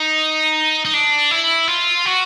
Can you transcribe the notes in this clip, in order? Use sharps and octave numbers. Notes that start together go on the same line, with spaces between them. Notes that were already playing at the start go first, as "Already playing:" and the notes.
Already playing: D#4
D#4
D4
E4
F4
F#4